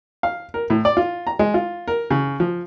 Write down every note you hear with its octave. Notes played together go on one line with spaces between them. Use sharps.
F5
A#4
A2
D5
F4
A#5
G#3
F4
A#4
C#3
F3